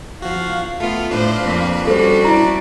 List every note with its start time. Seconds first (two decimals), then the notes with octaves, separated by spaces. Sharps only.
0.22 F3 F#4 F5
0.80 A3 B3 F4 F5
1.11 A2 D4 B4 C5
1.43 F2 A#3 C4
1.87 G3 C#4 F#4 A4 C5
2.25 E4 D5 A#5